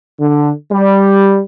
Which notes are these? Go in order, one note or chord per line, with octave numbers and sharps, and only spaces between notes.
D3
G3